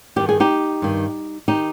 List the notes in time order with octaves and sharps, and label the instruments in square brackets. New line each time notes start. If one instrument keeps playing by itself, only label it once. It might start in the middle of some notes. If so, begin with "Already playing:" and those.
[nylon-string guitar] G2 D#3 G4
G#4
D#4 G4
G2 D#3
D#3 D#4 G4